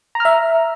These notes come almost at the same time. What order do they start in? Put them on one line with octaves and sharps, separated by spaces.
A#5 F6 E5